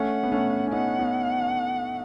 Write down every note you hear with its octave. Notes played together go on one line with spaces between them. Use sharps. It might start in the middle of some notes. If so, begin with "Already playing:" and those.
Already playing: A3 C#4 F#5
B3
A3 C#4
C#4
B3 D#4 F#5
B3 D#4